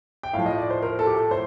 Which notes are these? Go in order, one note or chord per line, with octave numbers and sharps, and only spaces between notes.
G5
A2 F3 F5
D#5
D5
C5
A#4
A4
G4
A4
A2 C5